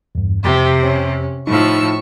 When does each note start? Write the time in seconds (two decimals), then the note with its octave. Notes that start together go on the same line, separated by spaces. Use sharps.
0.15 E2 G2
0.44 F2 C3 G4
0.82 C#4
1.47 A2 F3 D#4 C#6 E6